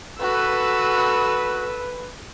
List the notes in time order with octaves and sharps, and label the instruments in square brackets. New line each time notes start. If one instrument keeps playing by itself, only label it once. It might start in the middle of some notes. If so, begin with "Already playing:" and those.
[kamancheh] F#4 [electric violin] A4 E6 [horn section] B4